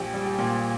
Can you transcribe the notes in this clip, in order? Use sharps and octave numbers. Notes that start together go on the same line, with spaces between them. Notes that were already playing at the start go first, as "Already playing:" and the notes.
Already playing: A#1 G4
G3
G4
A#2